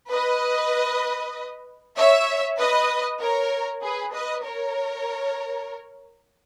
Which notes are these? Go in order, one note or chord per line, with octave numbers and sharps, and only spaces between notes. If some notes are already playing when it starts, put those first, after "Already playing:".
B4 D#5
C#5 E5
B4 D#5
A#4 C#5
G#4 B4
B4 D#5
A#4 C#5